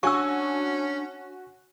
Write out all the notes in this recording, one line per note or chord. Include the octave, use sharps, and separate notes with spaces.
C#4 D4 F#4 G#5 C#6 E6